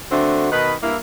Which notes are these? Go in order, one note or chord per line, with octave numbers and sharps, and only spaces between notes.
D3 A3 C4 D4 F#4
B2 D#3 D#4 B4
G2 A#3 E4